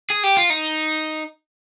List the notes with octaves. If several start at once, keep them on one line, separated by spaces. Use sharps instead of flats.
G#4
G4
F4
D#4